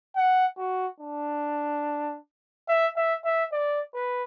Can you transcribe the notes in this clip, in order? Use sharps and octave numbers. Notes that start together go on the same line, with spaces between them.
F#5
F#4
D4
E5
E5
E5
D5
B4